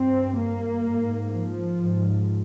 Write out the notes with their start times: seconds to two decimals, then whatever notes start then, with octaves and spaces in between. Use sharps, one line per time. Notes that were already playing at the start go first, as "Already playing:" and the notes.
Already playing: G2 C4
0.37 A#3
0.84 G#2
1.31 F3
1.78 G#2